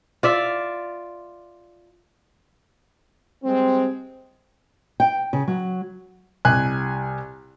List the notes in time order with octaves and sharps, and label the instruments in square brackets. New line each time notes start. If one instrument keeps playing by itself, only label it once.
[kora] F4 D5 E5 F5
[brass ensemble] G3 G#3 C4
[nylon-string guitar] G5
C#3
F#3
[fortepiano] C2 G#5 F#6